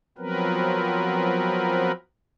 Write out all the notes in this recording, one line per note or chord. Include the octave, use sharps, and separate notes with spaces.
F3 F#3 B3 C4 A#4 B4